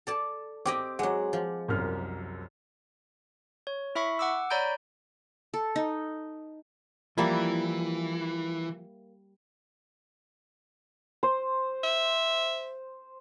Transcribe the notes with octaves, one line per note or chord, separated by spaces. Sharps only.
A4 D5 A5
C4 G4 D#5 D6
F#3 G#3 F#5
F3
C2 F#2 F6
C#5
E4 E5 B5 C#6
F#5 D6 E6
C#5 D5 A#5 B5 G6 D7
A4
D#4
E3 F3 G3 A#3 E4
C5
E5